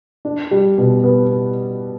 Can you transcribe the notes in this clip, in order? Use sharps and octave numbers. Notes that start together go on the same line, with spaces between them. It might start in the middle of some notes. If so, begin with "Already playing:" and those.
D4
G3
B2
B3